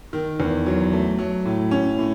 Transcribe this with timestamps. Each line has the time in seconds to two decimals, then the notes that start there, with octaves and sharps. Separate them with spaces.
0.13 D#3
0.40 E2
0.66 F#3
0.92 A3
1.19 F#3
1.46 A2
1.71 C#4
1.99 A2